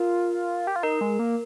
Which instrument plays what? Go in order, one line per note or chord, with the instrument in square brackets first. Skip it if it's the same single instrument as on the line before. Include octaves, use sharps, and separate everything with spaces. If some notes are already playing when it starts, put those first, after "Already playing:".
Already playing: [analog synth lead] F4 [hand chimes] A#4
[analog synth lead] G4
F4
[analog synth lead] D#4 [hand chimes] A#4
[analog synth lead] G#3
A#3